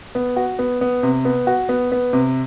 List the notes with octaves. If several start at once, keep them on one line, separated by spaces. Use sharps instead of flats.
B3
F#4
B3
B3
C3
B3
F#4
B3
B3
C3